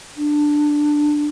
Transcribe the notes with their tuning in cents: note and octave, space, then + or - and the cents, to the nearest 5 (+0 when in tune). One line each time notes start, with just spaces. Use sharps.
D4 +10